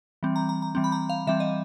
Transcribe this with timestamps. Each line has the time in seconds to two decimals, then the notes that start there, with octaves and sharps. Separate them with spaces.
0.23 E3 G3 C4
0.36 A#5
0.49 A#5
0.62 A#5
0.75 E3 G3 C4
0.84 B5
0.92 A#5
1.09 F5
1.27 E3 G3 C4 E5
1.40 D#5